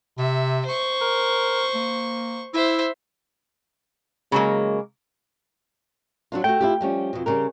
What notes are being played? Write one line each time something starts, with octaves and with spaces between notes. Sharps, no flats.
C3 E5
C5 C#6
A#4
A#3
E4 C5 E5
C#3 F#3 G#3 A#3
F#3 D4 F4
A3 F#4 G5
E4 F4 G4
F3 G3 C#4
F2 B2
C#3 G3 A#4